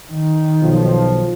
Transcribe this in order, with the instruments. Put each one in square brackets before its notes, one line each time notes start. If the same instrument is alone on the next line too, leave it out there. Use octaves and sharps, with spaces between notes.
[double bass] D#3
[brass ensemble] B1 F3